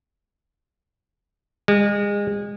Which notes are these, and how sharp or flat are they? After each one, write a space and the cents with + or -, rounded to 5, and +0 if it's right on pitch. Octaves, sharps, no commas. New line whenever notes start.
G#3 -30